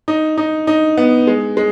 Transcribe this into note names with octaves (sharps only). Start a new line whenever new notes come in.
D#4
D#4
D#4
B3
G#3
G#3